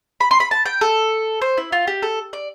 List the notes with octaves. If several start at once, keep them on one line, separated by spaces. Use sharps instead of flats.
B5
C6
B5
A5
G5
A4
C5
E4
F4
G4
A4
D5